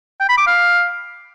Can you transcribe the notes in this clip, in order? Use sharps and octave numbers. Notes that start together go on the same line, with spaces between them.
G5
B5
D6
F5